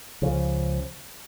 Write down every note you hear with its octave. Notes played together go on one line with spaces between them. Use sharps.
C#2 C#3 F3